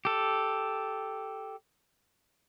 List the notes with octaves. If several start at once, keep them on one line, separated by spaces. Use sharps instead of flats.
G4 A4